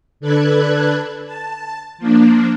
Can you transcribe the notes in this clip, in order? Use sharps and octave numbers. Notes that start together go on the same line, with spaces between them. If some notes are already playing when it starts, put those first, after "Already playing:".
D3 D4 A4 B4 F#6 G#6
A5
F3 A#3 D4